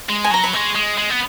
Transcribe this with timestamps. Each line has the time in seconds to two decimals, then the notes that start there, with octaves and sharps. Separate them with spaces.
0.09 G#3
0.24 G#5
0.31 F#3 A#5
0.44 B5
0.53 G#3 C#6
0.75 G#3
0.98 G#3
1.10 B3